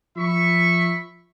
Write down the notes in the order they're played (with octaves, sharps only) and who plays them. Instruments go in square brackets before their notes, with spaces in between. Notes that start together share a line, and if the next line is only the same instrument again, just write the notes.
[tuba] F3 [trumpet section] E5 B5 C#6